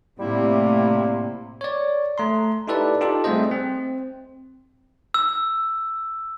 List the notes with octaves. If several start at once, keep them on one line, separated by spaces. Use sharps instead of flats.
A2 C3 G3 A#3 E4
C#5 D5
A3 A#5 C6
D#4 E4 G4 A4 B4 D5
D#4 F4 G4 A4
G3 A3 C4 G#4 C5 D#5
C4
E6